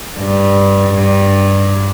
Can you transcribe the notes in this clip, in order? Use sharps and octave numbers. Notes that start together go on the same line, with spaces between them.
G2
G2